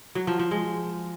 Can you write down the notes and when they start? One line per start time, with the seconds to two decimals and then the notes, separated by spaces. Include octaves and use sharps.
0.15 F#3
0.27 F3
0.39 F3
0.51 G#3